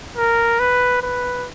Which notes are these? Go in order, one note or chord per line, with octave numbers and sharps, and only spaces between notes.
A#4
B4
B4